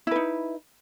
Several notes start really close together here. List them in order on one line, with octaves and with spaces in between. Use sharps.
E4 B4 D#4